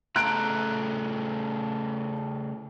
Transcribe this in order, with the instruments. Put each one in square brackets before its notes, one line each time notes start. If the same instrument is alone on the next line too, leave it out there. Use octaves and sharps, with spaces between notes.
[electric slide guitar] C#3 A3 A#5 [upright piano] F#6 D7